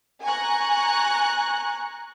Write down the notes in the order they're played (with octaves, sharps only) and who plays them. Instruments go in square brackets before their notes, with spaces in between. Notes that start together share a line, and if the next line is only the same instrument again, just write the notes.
[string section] G#5 A#5 C#6 F#6